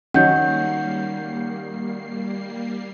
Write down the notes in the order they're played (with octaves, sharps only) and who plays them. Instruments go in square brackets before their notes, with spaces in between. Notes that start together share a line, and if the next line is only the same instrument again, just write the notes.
[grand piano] D#3 F#3 [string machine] G3 A#3 C7 [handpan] C#4 [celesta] F#5 G6